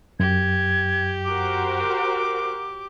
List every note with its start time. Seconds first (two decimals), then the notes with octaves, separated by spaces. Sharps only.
0.20 F#2 G4 G#6
1.25 F#4 A#4 C5 D6